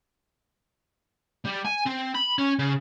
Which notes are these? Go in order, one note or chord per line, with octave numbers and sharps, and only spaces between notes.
G3
G#5
C4
B5
C#4
C#3